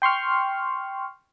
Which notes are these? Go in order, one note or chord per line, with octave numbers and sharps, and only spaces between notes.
G5 C6 C#6 F6